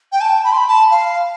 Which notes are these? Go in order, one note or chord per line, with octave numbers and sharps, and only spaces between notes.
G5
A5
B5
C6
B5
A5
F5